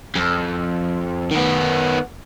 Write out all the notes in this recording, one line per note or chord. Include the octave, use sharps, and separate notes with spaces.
F2
D#3 B3